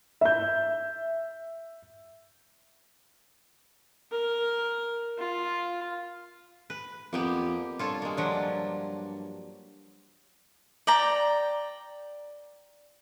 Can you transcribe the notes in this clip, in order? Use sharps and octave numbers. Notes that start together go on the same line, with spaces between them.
E5 G6
A#4
F4
B4
F2 A#3 B3 G4
G2 F4 A4 C#5
G#3 A#3
F3 F#3 D4
D5 G5 A#5